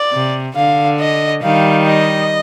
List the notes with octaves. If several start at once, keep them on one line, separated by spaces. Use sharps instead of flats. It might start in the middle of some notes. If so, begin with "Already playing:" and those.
Already playing: D5
C3
D3 F5
D#5
D#3 G3 F5
D#5